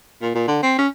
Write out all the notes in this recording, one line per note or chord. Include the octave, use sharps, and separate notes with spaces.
A#2
A#2
D3
C4
C#4